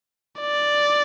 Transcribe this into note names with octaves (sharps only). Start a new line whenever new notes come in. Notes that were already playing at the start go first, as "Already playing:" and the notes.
D5